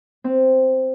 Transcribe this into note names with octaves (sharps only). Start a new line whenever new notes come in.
C4